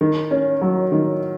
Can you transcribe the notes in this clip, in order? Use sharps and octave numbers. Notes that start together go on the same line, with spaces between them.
D#3
C#4
F#3
D#3